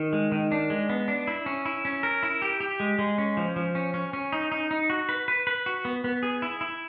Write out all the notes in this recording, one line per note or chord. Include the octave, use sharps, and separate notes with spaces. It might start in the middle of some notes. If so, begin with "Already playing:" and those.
Already playing: D#3
G#3
D#3
D4
G#3
B3
D4
E4
C#4
E4
C#4
A#4
E4
G4
G4
G#3
G#3
C#4
F3
F3
C#4
C#4
C#4
D#4
D#4
D#4
F#4
B4
B4
B4
F#4
B3
B3
G#4
E4
E4